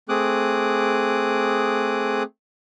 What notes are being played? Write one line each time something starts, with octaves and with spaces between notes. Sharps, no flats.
A3 C4 G#4 D6 D#6 F#6